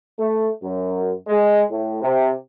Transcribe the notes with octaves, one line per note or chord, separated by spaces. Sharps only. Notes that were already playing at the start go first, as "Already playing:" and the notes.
A3
F#2
G#3
A2
C3